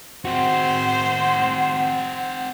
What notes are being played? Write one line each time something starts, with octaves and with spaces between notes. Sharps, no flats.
C4 F#4 C5 F#5